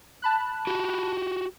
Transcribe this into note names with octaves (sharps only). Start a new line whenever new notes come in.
A5 B5 F#6
F#4 G4